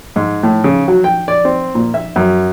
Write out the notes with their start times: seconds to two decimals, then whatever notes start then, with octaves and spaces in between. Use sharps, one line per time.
0.16 G#2
0.43 A2
0.64 C#3
0.88 F#3
1.04 G5
1.28 D5
1.45 C4
1.75 A#2
1.94 E5
2.16 F#2